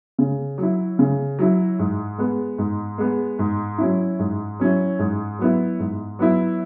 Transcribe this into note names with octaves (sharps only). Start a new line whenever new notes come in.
C#3
F#3 E4
C#3
F#3 E4
G#2
G#3 B3
G#2
G#3 B3
G#2
F#3 C#4 E4
G#2
F#3 C#4 E4
G#2
F#3 B3 E4
G#2
F#3 B3 E4